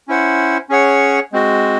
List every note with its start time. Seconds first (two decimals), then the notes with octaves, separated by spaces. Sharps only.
0.08 C#4 E4 C5 F#5
0.69 C#4 G#4 C#5 F#5
1.32 G#3 C4 F#4